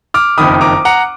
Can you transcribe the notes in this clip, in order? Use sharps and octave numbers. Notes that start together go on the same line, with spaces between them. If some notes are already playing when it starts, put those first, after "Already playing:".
D6 F6
F#1 F2 D#3 B5 D#6
A#5 D6
F#5 A#5